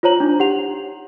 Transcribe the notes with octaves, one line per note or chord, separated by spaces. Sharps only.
F4 C5 C#5 A#5 F#7
D4 D#4
G4 F#5 F7